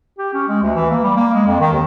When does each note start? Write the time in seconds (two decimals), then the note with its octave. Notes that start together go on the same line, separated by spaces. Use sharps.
0.19 G4
0.34 C#4
0.48 G#3
0.63 D2
0.75 E3
0.90 A#3
1.04 G3
1.17 A#3
1.34 G#3
1.47 F2
1.60 D#3
1.73 D#2